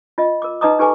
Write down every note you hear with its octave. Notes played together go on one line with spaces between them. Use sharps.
F4 D#5
A#4 D6
D#4 B4 D#5 A#5 D6 D#6
D#4 G4 A4 B4 G#5 D6